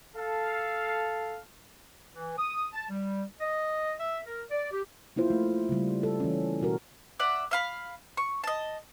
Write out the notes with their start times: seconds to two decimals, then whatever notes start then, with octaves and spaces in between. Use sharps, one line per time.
0.16 A4 F5
2.15 E3
2.38 D#6
2.73 A5
2.89 G3
3.41 D#5
4.00 E5
4.25 A#4
4.50 D5
4.71 G4
5.16 A#3 E4 F4 C5
5.30 A3
5.69 C#3 G3
6.03 A4
6.20 E3 C#4
6.61 B2 F#4 A#4
7.20 D5 E5 F#5
7.51 E5 F5 B5
8.17 C#6
8.44 D#5 A5